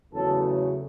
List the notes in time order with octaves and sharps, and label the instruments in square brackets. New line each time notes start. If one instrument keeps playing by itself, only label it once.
[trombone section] E2 C#3 F#3 A3 A4